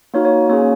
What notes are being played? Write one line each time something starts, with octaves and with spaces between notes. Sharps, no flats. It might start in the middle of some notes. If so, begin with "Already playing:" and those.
A#3 D#4 F#4 C#5
C#5
A#3 C#4 G#4 C#5